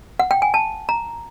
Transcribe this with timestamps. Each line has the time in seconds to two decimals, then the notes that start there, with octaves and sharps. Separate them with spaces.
0.19 F#5
0.31 G5
0.42 G#5
0.54 A5
0.89 A#5